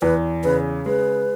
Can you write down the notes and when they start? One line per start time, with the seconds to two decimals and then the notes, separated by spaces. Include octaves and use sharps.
0.02 E2 B4
0.44 C#3 B4
0.86 G#3 B4